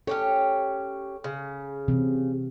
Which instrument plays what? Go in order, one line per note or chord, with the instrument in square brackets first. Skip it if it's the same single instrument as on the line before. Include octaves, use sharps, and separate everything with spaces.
[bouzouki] C#4 G4 C#5 [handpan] A4
[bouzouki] C#3
[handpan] C3 E3 C4